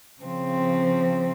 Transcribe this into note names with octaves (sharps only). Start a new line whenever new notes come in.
C#3 F3 C4